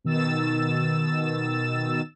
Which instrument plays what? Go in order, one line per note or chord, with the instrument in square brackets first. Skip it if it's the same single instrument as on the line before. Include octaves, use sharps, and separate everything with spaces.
[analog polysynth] B2 D#3 E6 A6 E7